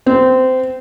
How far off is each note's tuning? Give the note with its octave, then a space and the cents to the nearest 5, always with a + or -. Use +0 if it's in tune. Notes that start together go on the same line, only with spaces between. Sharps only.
C4 -20